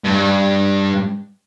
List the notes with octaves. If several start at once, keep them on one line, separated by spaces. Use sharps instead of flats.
G2